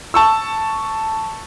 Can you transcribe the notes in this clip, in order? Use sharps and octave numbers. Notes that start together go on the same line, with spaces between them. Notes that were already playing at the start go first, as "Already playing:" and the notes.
A5 C#6 E6